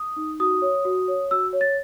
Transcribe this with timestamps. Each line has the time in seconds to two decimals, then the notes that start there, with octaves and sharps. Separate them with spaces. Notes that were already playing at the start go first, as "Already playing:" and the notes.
Already playing: D#6
0.16 D#4
0.40 F#4 D#6
0.62 C#5
0.85 F#4
1.08 C#5
1.31 F#4 E6
1.53 C#5
1.61 A6